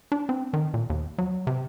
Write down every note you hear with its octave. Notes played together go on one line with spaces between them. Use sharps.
D4
C4
D#3
A#2
D#2
F#3
C3